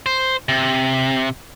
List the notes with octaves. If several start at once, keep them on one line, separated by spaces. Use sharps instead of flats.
C5
C3